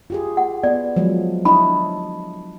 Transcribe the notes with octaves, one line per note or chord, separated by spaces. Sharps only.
F4 G4 G#4
F#5
B3 D5
F3 F#3 G#3
D4 E4 D#5 B5